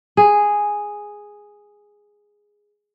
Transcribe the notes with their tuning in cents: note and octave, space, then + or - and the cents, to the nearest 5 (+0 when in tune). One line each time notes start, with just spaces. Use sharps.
G#4 -5